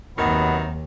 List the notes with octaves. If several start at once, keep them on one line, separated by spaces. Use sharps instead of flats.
D#2 C3 D#3 F#3 B3